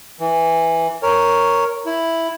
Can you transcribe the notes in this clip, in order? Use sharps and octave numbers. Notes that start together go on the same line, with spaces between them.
E3
A#4 C#5
E4